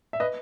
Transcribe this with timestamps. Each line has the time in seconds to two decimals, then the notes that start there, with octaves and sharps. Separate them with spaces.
0.13 E5
0.20 B4 D#5